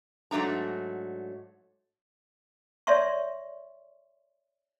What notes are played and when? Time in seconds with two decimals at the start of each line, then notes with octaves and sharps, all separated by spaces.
0.31 G#2 F#3 A3 D4 A#5
2.87 C#5 D5 E5 C6 C#6